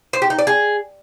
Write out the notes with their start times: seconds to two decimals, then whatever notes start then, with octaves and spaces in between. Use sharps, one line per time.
0.13 C5
0.22 G4
0.30 D#4
0.39 D5
0.47 G#4